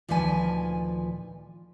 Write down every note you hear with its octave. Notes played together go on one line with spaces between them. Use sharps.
D2 A#2 D#3 F3 B4 G#5